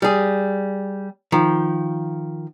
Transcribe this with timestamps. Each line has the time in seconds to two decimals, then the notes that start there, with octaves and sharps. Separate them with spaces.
0.02 G3 G#4
1.32 D#3 F3